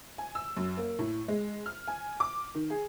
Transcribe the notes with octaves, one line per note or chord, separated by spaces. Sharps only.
G#5
E6
F#2
A#3
A2
G#3
F6
G#5
D6
D#3
G#4